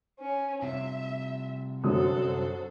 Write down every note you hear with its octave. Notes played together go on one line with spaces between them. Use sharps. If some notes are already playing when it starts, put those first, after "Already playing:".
C#4
C3 G3 F4 E5
F#2 D3 F#4 A4 C5 D#6